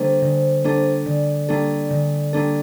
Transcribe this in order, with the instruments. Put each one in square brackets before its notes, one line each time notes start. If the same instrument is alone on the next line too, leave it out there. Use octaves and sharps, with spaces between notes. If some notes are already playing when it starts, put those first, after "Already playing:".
Already playing: [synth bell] D3 G3 A#3 D4 A4 [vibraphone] C5
[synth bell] D3
G3 A#3 D4 A4
[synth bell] D3 [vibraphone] D5
[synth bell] G3 A#3 D4 A4
D3
G3 A#3 D4 A4